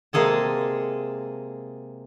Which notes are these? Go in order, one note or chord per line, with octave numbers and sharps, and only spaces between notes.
C3 G#3 A#3 G#4 A4 A5